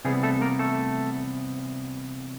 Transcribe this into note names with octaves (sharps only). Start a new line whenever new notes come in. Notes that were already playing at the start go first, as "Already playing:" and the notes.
C3 E3 G3 B3 G#4
A3 A4
A#3 A#4
A3 A4